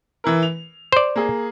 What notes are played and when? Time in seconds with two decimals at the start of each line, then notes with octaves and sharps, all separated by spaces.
0.24 E3 E4 A#4
0.43 F7
0.92 C5 D5
1.16 A#3 G#4